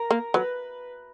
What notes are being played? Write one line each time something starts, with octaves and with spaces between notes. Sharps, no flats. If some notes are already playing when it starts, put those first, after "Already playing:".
Already playing: A#4
A#3
F#3 B4